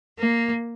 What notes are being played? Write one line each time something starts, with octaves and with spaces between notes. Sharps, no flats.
A#3